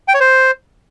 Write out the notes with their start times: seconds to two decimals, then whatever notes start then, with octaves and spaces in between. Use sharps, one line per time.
0.08 G5
0.14 C#5
0.20 C5